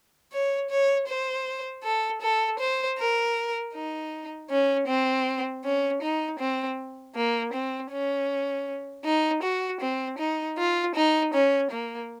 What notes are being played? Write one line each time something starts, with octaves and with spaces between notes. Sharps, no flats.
C#5
C#5
C5
A4
A4
C5
A#4
D#4
C#4
C4
C#4
D#4
C4
A#3
C4
C#4
D#4
F#4
C4
D#4
F4
D#4
C#4
A#3